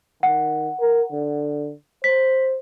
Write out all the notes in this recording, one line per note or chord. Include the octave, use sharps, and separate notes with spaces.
D#3 F#5
A#4
D3
C5 B6